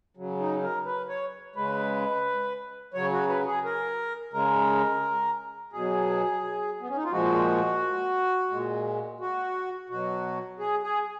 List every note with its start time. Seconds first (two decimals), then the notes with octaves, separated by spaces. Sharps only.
0.17 C#3 F#3
0.39 D#4
0.63 A#4
0.86 B4
1.09 C#5
1.56 C#3 G#3 B4
2.94 C#3 F#3 C#5
3.12 F#4
3.29 B4
3.47 G#4
3.64 A#4
4.33 C#3 G#3 A#4
5.73 B2 F#3 G#4
6.80 B3
6.89 C#4
6.96 D#4
7.04 F4
7.12 A#2 F3 G#3 F#4
8.51 A#2 G#3
9.21 F#4
9.89 B2 F#3 F#4
10.59 G#4
10.83 G#4